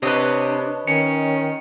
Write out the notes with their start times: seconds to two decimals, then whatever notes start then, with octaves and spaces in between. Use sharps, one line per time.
0.03 C3 D4 B4 C#5 D#5
0.87 D#3 C#4 C#7